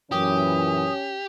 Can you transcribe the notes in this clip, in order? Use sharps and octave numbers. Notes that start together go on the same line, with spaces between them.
F#2 A#2 E3 C#4 G4 D#6